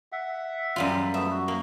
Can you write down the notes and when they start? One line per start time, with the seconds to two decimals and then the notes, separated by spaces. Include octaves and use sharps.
0.12 E5 F#5
0.76 F#2 G3 F4
1.14 A3 B3 E5
1.30 F#4
1.48 A#3